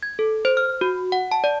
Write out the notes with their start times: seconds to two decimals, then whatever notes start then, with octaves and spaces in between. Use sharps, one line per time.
0.03 G#6
0.19 A4
0.45 C5
0.57 F6
0.81 F#4
1.12 F#5
1.31 A5
1.44 D5